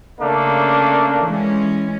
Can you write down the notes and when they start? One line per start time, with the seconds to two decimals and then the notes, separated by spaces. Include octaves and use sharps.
0.21 C#3 A3 A#3 D4
1.24 E3 G#3 C#4